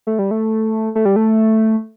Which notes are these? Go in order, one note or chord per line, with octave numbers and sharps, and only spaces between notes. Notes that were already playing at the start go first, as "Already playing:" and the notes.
A3
G3
A3
A3
G3
A3